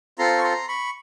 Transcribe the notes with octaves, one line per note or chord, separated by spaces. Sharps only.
C4 F4 A4 A#5 C6
C#6
A#5 C6
B5 C#6